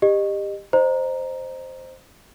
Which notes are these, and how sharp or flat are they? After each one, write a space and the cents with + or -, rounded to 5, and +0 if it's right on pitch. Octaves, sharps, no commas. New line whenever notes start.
G4 +20 D#5 -25
C5 +0 D#5 -25 A#5 +0